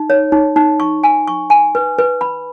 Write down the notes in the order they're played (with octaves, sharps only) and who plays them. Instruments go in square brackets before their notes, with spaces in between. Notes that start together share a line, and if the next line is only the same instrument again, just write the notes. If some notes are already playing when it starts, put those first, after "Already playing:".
Already playing: [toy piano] D#4
C#5
D#4
D#4
C#6
G#5
C#6
G#5
B4
B4
B5